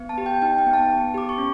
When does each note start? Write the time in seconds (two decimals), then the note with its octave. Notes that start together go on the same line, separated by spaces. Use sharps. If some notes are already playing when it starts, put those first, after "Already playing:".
Already playing: B3
0.09 A5
0.18 G4
0.26 G5
0.42 D#4 G5
0.58 G5
0.67 B3
0.73 A5
0.91 B3
1.14 G4 D6
1.29 C#6
1.38 C#4